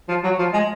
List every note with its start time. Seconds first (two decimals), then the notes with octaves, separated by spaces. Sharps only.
0.09 F3
0.24 F#3
0.39 F3
0.54 G#3